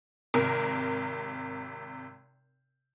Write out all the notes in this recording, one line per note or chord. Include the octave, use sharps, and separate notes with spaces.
G#1 C3 A#4